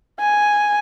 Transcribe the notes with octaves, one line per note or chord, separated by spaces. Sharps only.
G#5